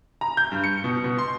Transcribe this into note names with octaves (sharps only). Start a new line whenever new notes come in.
A#5
G6
G2
C#7
B2
B2
C6